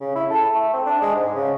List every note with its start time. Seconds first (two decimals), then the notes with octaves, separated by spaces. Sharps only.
0.01 C#3
0.15 E4
0.31 A4
0.55 A3
0.73 C4
0.86 D4
1.02 G#3
1.16 G#2
1.35 C#3